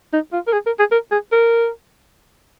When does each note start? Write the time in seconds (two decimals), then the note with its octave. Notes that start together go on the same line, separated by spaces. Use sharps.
0.13 D#4
0.33 F4
0.47 A#4
0.53 G#4
0.66 A#4
0.79 G#4
0.92 A#4
1.11 G#4
1.32 A#4